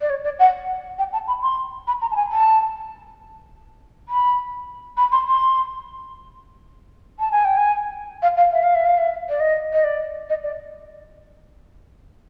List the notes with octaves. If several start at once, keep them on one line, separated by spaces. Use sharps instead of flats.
D5
C#5
D5
F#5
G5
A5
B5
C6
B5
A#5
A5
G#5
A5
B5
B5
C6
C6
A5
G#5
G5
G#5
F5
F5
E5
F5
E5
F5
E5
D5
D#5
D#5
D5
D#5
D5